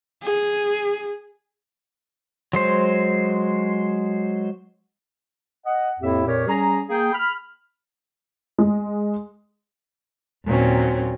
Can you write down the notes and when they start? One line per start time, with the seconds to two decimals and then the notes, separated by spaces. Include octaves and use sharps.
0.23 G#4
2.53 F#3 G#3 C5
5.66 D#5 F#5
6.00 F2 A2 A#3 E4 G4 E5
6.26 F2 A#2 G4 A#4 C#5
6.48 G3 C#4 G#4 A#5
6.89 A#3 G#4 G5
7.13 B5 F6
8.58 G#3
10.47 D#2 A#2 F#3 C4 C#4